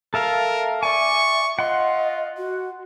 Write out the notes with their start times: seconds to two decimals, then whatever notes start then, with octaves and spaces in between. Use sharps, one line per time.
0.14 A4 A#4 E5 F5
0.83 D5 E5 G#5 C#6
1.59 F4 D#5 F#5 C6
2.37 F#4